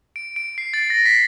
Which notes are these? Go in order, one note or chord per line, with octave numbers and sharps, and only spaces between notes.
D7
D7
C7
A6
A#6
B6